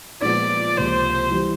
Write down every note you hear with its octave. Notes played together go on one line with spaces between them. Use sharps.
A#2 F3 G#3 B3 D5
C#2 C3 F3 A#3 C5
E3 G3